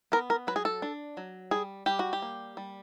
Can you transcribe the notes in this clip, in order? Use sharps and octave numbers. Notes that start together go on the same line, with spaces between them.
B3 A#4
A#4
F#3 B4
G#4
A4
D4
F#3
G3 G#4
G3 G4
F#4
G4
A#3
G3